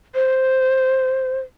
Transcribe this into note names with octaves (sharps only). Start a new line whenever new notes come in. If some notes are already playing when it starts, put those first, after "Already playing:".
C5